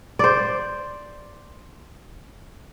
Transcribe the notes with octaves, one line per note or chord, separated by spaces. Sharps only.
C5 D5